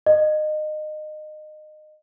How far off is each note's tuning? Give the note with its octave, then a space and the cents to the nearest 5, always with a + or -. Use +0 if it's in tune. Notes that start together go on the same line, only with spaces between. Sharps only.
D#5 -25